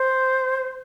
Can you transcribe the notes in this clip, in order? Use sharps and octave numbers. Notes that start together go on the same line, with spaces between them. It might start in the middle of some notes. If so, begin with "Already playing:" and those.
Already playing: C5